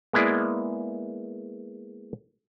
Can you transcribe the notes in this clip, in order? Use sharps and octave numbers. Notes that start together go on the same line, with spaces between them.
G#3 A#3 B3 E4 G#4 D5